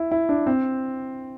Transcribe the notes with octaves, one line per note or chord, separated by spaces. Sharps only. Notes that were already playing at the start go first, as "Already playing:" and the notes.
Already playing: E4
E4
D4
C4